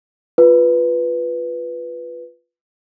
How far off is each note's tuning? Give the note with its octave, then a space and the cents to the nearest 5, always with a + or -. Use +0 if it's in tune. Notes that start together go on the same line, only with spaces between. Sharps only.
F4 +0 B4 +0